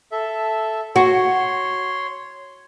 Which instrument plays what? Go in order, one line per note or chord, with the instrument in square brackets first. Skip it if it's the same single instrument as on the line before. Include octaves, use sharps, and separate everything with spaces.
[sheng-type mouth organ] A4 E5
[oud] F#4 [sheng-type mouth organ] C#5 C6